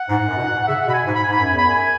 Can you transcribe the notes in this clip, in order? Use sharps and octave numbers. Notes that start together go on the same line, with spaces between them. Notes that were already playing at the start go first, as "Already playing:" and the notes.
Already playing: F#5
G#2
F#2
B2
G#2
G#2
F#5
C#3 E5
F#5
B2
B5
G#5
G#2
B5
G#2 G#5
B5
F#2
G#5
E2
B5
F#2 G#5